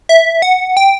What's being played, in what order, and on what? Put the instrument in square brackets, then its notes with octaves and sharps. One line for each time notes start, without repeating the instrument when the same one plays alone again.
[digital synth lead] E5
F#5
G5